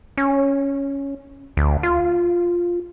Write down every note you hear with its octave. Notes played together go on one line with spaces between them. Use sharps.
C#4
D2
F4